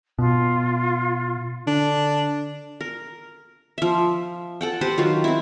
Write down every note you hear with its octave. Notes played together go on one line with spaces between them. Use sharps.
B2 F4
D3 D4
A#4
F3 E5
A4 F#5 G5
G4 B4 C5 F#5
D#3 F#3 F4
C4 E4